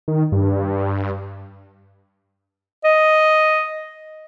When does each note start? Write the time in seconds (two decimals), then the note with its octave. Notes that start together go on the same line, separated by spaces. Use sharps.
0.08 D#3
0.32 G2
2.84 D#5